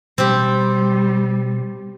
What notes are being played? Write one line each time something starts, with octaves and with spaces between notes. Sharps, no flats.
B2 G3 C4 G4